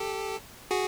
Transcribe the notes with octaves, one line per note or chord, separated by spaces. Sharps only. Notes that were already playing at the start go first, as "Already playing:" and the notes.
Already playing: G4 A4
F#4 G#4